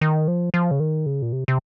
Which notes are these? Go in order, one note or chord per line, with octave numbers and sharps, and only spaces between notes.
D#3
F3
F3
C#3
D#3
C#3
A#2
C3
C3